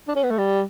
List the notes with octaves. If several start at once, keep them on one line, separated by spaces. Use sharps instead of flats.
D4
C#4
B3
A3
G3